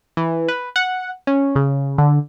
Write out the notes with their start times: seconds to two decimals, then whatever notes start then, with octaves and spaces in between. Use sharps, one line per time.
0.17 E3
0.48 B4
0.76 F#5
1.27 C#4
1.56 C#3
1.98 D3